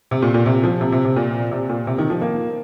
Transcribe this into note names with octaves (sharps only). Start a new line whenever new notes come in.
C3
A#2
A#2
C3
F3
C3
C3
C3
A#2
C3
A#2
C3
D#3
F3
A#3